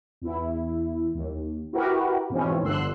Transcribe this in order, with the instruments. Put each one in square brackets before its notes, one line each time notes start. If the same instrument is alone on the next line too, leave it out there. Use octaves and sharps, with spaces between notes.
[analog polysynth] E2 E4
D#2
E4 F#4 G4 A#4 B4
G#2 B2 E3 F3 C4 C#4
G1 D3 C6 E6 F#6